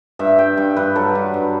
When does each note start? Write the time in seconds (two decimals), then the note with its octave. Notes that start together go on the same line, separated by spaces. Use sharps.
0.19 G2 E5
0.38 G2 G5
0.57 G2
0.76 G2 B4
0.96 F#3 A4
1.15 G2
1.34 G2